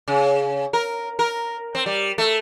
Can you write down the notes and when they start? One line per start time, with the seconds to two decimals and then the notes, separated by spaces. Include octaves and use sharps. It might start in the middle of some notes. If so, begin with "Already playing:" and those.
0.08 C#3
0.73 A#4
1.19 A#4
1.75 C4
1.86 G3
2.18 A3